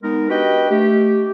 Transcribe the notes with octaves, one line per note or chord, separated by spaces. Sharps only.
G#3 B3 D#4 A#4
D4 F#4 G4 B4 D#5 G5
A3 G4